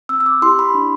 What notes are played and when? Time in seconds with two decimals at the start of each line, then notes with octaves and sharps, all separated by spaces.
0.09 C4 E6
0.20 E6
0.26 D6
0.42 E4 G4 C6
0.59 B5
0.75 D4